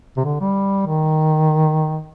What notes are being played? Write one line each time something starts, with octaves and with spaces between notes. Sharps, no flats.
C3
D3
G3
D#3